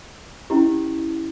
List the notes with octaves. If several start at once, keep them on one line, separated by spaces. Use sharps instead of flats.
C#4 E4 G4